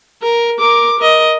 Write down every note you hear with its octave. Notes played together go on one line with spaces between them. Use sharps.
A#4
A#4 D6
A#4 D#5